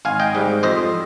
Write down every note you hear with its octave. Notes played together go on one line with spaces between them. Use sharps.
G#1 F5 G#5
D#5 G5
G#2 G3
F2 C5 D#5